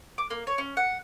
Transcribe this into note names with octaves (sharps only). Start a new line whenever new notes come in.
D6
A#3
C#5
C#4
F#5